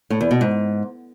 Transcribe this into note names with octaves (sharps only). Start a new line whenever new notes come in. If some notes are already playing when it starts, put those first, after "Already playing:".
A2
E2
B2
G#2